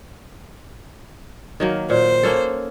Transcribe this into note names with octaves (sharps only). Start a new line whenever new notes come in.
D#3 F#3 A#3
A#2 C5
A#3 C#4 A4